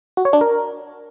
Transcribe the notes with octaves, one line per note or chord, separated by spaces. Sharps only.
F#4
C#5
D4
A#4